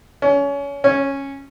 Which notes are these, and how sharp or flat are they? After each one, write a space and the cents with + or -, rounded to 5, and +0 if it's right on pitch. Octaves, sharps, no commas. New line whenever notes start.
C#4 +25
C#4 -10